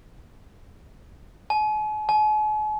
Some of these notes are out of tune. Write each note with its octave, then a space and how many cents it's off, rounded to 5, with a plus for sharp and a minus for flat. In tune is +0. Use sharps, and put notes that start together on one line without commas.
G#5 +45
G#5 +45